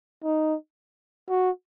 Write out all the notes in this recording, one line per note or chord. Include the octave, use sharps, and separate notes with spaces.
D#4
F#4